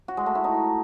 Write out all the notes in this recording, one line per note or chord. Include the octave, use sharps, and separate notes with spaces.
F#4
G#3
A3
E4
D#4